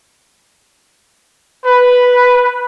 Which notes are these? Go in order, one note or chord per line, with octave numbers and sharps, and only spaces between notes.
B4